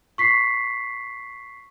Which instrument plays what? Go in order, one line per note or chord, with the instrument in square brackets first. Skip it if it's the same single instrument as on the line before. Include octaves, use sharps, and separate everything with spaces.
[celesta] C#6 B6 C7